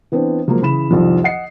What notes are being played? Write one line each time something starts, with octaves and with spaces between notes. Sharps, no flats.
E3 B3 C4 D4
F3 F#3 G#3 A#3
C#3 E3 B5 E7
C2 F2 D#3 F3
D#5 F#5 C7 C#7